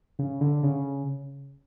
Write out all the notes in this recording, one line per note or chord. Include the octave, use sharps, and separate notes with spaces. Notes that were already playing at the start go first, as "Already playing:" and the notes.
C#3
D3
C#3